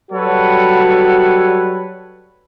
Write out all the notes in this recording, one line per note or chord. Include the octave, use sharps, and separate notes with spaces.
F#3 G3 F#4 A4 B4 C#5